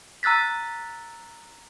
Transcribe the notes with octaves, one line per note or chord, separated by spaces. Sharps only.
A#5 E6 F#6 A6 B6